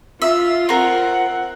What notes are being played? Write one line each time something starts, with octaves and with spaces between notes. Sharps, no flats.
F4 E5
C4 A#4 F#5